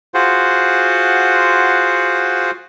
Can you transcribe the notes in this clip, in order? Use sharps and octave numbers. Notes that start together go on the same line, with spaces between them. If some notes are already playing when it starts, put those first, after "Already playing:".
F4 F#4 G#4 C5 F#5